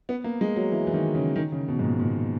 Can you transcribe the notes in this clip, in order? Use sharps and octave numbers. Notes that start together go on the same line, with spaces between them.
B3
A#3
G#3
F#3
E3
E3
D#3
C#3
D#3
C#3
B2
G#2
A#2
A#2